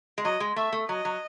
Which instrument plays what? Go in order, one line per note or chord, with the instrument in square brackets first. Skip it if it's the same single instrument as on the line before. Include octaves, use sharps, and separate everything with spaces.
[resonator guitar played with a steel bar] G#3
[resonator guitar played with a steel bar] F#3 [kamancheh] D#5
[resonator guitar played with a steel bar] G#3
[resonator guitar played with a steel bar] A3 [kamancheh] E5
[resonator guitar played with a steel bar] A3
[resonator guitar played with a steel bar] F#3 [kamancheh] D#5
[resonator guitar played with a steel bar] F#3